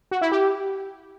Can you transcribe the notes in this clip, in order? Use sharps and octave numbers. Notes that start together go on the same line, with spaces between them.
F#4
E4
G4